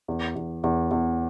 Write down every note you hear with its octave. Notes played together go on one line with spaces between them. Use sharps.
E2
E2
E2
E2